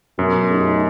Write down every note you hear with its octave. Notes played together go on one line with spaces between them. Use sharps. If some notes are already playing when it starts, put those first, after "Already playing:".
F#2 B2
A3 D#4 G4